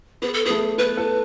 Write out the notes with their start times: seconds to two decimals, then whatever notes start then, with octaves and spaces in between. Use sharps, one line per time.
0.22 B3 G#4
0.34 A4
0.45 B3 G#4
0.50 A3
0.78 B3 B4
0.97 A4